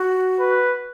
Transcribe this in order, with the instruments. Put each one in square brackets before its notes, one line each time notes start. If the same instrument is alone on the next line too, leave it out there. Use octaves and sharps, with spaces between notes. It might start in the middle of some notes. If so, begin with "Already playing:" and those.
Already playing: [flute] F#4
[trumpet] B4